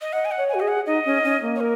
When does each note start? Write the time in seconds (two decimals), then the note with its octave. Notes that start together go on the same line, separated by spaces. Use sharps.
0.01 D#5
0.13 D#5 F#5
0.25 G#5
0.31 F#5
0.37 C#5
0.49 F#4 G#5
0.60 G#4 D#5
0.68 F#5
0.86 D#4 D#5
1.05 C#4
1.24 C#4
1.42 A#3
1.56 C#5
1.61 A#4